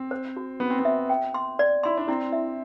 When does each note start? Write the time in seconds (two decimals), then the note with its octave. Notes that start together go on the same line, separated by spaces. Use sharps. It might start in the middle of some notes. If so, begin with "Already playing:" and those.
Already playing: C4
0.11 C5
0.37 F#4
0.60 B3 F#4
0.70 C4
0.79 B3
0.85 E5
1.10 G5
1.34 C6
1.59 D5
1.83 E4 C6
1.97 D4
2.08 C4 E4
2.33 E5